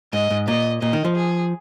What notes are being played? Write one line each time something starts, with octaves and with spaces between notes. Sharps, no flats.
G#2 D#5
G#2
A#2 D#5
A#2 D#5
D#3
F3
G#4